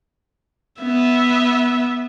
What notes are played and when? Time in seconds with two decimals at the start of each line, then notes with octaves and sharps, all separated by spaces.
0.81 B3 E5